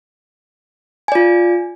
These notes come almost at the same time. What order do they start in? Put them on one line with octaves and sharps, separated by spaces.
G#5 D5 F4